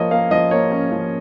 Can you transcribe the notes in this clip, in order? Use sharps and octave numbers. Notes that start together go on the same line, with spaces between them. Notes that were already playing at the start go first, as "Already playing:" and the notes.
Already playing: F3 A#3 C#5 D#5
A#3 F5
F3 D#5
A#3 C#5
C#4
F3